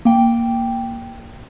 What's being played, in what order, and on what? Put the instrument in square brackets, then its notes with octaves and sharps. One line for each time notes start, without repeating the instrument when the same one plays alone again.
[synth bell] A#3 G5